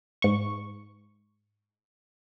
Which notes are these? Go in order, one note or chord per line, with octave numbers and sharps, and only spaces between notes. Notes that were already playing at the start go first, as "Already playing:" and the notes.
G#2 C#6